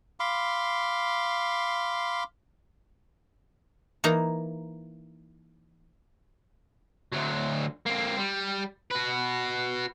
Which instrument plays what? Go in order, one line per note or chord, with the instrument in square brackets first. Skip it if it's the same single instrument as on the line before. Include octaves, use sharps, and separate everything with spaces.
[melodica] F5 B5 C6 D6
[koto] E3 A#3 D#4 A#5
[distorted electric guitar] D2 F#3
A#3 C4
G3
F#4 B4